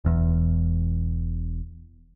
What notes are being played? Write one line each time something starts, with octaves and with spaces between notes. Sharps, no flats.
E1 E2